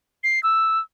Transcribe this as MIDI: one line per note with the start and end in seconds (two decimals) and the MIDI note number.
0.24 0.42 96
0.43 0.80 88